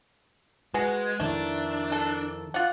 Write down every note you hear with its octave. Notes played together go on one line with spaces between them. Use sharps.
G#3 F#4 G#4 B4
F2 D#3 A3 D4 E4
A4
F4 F#5